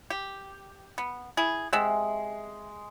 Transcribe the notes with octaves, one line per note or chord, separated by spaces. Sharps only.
G4
B3
E4 G#4
C3 G#3 E5 F#5